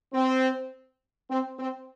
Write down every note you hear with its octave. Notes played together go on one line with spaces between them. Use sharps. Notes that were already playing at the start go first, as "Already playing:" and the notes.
C4
C4
C4